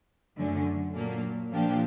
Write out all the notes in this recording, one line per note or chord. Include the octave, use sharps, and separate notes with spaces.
F#2 D3 F#3 A3 C#4
A#2 F#3 A#3 D4
A#2 F3 A#3 D4 G4